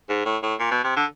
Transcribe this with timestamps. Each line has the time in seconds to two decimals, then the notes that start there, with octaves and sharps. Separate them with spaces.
0.09 G#2
0.26 A2
0.43 A2
0.60 A#2
0.71 B2
0.84 C3
0.96 D3